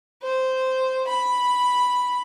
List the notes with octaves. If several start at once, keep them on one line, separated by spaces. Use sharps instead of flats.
C5
B5